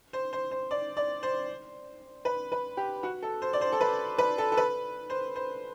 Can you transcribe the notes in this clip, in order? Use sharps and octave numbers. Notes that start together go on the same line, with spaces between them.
C5
C5
C5
D5
D5
C5
B4
B4
G4
F#4
A4
C5
D5
C5
A4
B4
B4
A4
A4
B4
C5
C5